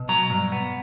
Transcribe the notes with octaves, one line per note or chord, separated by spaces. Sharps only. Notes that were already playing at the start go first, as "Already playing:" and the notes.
Already playing: B2
F#3 A#5
G2
B3